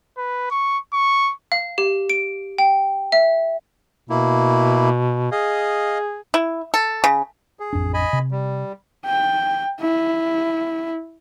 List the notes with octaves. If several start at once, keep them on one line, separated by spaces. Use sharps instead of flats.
B4
C#6
C#6
F5
G4
D7
G5
E5
B2 A#3 E4
G#4 D#5 F5
E4
A4
C#3
G#4
A1 F2 D4
D#5 G#5 B5
C3
G3
G5
E4